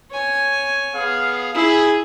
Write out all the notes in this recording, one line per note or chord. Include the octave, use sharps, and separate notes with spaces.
C#5 G#5
B3 G#4 F5
E4 G#4